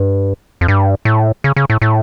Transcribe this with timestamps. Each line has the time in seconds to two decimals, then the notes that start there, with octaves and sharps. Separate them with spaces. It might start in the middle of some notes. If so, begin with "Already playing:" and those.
Already playing: G2
0.61 F2
0.68 G2
1.05 A2
1.44 C#3
1.56 C#3
1.70 A2
1.82 A2